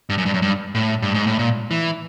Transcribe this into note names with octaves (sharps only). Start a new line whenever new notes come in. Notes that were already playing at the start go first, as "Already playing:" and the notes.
G2
F#2
G2
F#2
G2
A2
G2
G#2
A2
A#2
E3